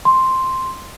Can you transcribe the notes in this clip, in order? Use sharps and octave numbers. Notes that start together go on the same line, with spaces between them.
C6